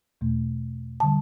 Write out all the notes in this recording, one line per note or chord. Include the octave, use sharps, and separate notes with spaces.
E2 B2 A3
D3 G3 A5